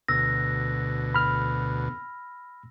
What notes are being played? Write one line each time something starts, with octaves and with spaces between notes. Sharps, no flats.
D2 B2 E6 A#6
B5 F6